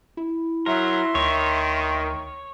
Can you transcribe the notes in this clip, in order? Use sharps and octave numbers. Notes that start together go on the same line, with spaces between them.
E4
F#3 A#4 E5 C6
D2 D#3 C#5